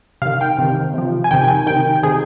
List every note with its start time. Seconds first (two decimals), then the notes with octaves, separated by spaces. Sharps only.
0.22 C3 D#3 F5
0.41 G5
0.58 C3 D#3
0.94 C3 F3
1.24 G#5
1.31 C3 D#3 G5
1.48 G#5
1.67 C3 D#3 G5
2.03 C3 D#3 G#4